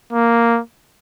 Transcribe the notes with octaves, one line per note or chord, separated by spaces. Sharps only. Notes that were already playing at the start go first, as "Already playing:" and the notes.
A#3